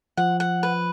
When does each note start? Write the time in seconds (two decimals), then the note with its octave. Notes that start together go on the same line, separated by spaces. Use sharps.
0.17 F3 F#5
0.40 F#5
0.63 B4